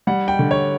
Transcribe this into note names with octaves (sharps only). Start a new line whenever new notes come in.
G3 F#5
G5
D3
C#5